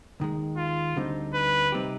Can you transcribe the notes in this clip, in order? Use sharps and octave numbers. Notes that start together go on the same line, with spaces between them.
D#2 D#3 G#3
F4
D2 D3 G3 C4 D#4
B4
C3 G3 C4 D#4 G4